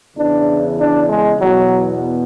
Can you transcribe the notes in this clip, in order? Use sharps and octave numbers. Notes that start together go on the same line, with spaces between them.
E2 C#3 E3 D4
D4
G#3
E2 B2 F#3